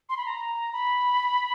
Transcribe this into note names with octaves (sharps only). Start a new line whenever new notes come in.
C6
B5
A#5
B5